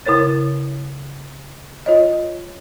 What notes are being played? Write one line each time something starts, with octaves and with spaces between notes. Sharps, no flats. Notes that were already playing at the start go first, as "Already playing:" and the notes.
C#3 E4 A#4 C#5 A6
F4 C#5 D#5